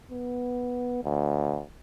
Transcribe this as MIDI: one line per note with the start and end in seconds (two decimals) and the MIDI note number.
0.11 1.01 59
1.04 1.61 38